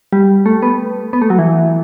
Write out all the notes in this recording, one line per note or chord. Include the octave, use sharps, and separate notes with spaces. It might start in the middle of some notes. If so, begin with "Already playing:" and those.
G3
A3
B3
B3
A3
F#3
E3